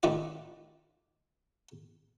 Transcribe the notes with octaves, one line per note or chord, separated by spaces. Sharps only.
A1 D#3 A3 E4 F4 D5